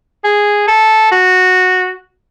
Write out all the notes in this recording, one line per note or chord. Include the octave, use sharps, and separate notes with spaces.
G#4
A4
F#4